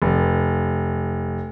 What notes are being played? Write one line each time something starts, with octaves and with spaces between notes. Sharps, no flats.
F1